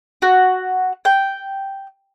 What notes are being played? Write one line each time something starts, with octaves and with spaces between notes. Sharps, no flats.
F#4
G5